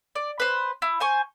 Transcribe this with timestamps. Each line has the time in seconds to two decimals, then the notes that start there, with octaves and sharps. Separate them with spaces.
0.15 D5
0.40 B4 C5
0.82 E4
1.00 C5 G#5 C#6